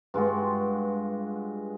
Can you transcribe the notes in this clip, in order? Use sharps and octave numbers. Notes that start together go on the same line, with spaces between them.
G2 G#3 F4 F#4